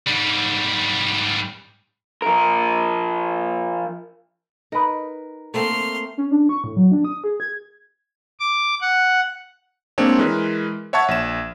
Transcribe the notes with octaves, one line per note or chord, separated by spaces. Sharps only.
G#2 G3
F3 A#4
D#4 A#4 B4
A3 A#3 C4 C6 F6
C#4
D4
C#6
A2
F#3
D4
D#6
G#4
G#6
D6
F#5
G#3 A#3 C4 D4 C#5
E3 G#3 A#4 B4
C#5 E5 F#5 A5 C#6 G#6
A#1 E7